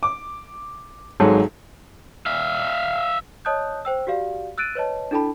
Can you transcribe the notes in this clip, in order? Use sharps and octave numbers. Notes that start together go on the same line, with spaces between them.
D6
G#1 G#2 F#3 G#4 A4
E5 F5
C#5 D#5 A5 D#6 F#6 G6
C5 G5 E6
F#4 G4 D5 F5
E6 F#6 A6 D7 D#7
B4 C#5 D#5 A5
D4 E4 A4 G5 A5 B5